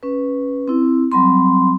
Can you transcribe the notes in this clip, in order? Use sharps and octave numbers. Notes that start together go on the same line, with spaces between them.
C#4 B4
C4 E4
F#3 G3 C4 B5 C6